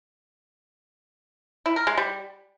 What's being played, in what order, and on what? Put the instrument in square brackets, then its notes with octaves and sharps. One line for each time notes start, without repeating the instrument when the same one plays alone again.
[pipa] E4
A#4
G#3
G3